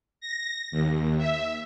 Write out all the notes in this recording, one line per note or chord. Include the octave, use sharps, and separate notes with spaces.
A#6
D#2
E5